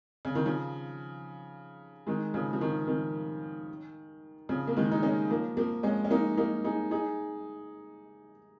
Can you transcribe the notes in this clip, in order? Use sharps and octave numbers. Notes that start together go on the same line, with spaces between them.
C#3
D#3
C#3 F3
D#3 G#3
C#3 F3
F3
D#3
D#3
C#3 F3
A#3
D#3 G#3
D#4
G#3 C#4
F3 A#3
F3 A#3
G#3 C#4
C#4
A#3 D#4
A#3 D#4
D#4 G#4
D#4 G#4